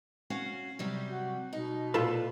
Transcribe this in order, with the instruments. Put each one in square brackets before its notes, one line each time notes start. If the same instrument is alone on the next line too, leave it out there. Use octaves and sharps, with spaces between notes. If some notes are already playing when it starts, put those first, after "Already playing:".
[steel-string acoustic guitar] C#4 F#4 F5
C3 F#3 G3
[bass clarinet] F#4
[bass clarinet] B2 [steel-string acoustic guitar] D#4
[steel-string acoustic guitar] A#2 [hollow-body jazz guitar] F4 A4 B4